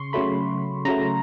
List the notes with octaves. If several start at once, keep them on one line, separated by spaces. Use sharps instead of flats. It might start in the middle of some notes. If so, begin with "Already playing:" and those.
Already playing: C#3 C6 C#6
C#3 F#3 A3 B5
C#3 F#3 A3 A#5